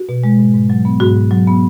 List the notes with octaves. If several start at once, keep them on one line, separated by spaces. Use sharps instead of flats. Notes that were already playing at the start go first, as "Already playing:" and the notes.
Already playing: F#4
B2
G#3
G#2
G#2
F#3
B3
G#2 F#4
G#2
F#3
B3